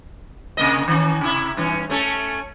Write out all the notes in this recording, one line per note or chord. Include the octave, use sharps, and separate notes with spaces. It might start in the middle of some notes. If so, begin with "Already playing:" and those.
C3 A#3 D#5
D#3 C#4
C3 E4
G2 E3 C#4
A3 C#4 A4